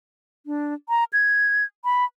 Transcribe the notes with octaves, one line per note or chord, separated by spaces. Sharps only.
D4
A#5
G#6
B5